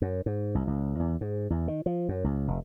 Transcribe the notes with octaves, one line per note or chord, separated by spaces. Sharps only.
F#2
G#2
C2
C#2
E2
G#2
E2
D#3
F3
F#2
C#2
F1